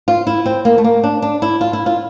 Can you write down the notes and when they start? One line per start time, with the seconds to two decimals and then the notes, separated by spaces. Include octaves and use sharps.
0.08 F4
0.27 E4
0.46 C4
0.65 A#3
0.78 A3
0.84 A#3
1.03 D4
1.22 D4
1.42 E4
1.61 F4
1.73 E4
1.86 F4